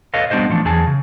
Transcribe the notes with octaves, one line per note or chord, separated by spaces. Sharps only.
A4 B4 C#5 D#5 F5
G3 B3 D4 F#4 C5 D#5
E3 F3 A3 D4
E2 F#3 G#4 G#5 A5
C#3